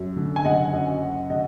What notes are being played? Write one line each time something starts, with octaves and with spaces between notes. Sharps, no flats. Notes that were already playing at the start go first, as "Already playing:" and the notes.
Already playing: F#2 F#3
D3
G#5
F#1 D#5 F#5
F#2
F#3
D3 D#5 F#5